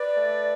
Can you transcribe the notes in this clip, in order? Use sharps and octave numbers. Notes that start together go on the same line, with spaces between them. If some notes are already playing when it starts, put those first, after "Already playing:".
Already playing: B4 D5
A3